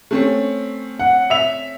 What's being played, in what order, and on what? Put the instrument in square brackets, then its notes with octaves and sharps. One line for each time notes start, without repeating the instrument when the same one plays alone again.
[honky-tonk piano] A3 C4 C#4
[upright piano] F#5
E5 F7